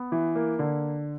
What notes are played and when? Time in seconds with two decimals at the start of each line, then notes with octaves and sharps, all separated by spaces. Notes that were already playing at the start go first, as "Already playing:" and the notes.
Already playing: B3
0.12 E3
0.36 A#3
0.59 D3